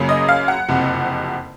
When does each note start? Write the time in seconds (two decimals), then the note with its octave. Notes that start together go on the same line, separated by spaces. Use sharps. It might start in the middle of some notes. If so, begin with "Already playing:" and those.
Already playing: F#2 C#3 F#3 A#3
0.09 D#5
0.28 F5
0.48 F#5
0.68 F#1 F2 C3